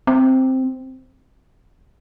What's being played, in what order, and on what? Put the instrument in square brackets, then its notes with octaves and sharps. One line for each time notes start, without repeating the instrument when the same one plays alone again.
[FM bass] C4